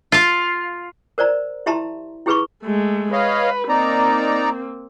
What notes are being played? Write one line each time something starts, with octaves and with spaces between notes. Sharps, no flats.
F4 F5
A#4 C5 D5 A#5
E4 G4 E5 A5 A#5 C6
E4 G4 G#4 B4 B5 C#6
G#3 A3
B4 C#5 D#5 F5
A#3 C4 D#4 D5 A#5